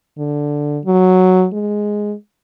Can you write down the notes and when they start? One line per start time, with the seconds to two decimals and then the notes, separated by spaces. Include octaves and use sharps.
0.18 D3
0.86 F#3
1.53 G#3